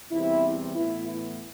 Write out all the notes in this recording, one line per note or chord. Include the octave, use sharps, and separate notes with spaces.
E2 C3 E3 G3 C4 E4
A2 E3 B3 E4
E4